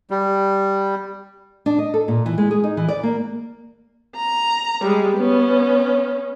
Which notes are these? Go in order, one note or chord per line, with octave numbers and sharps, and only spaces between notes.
G3
D4
D#5
A4
A#2
E3
G#3
G#4
D#4
E3
D5
A#3
A#5
G3 G#3
B3 C#4